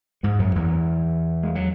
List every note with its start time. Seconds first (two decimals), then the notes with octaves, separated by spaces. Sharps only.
0.23 G#2 G#3
0.39 F#2 F#3
0.55 E2 E3
1.43 G#3
1.55 F#3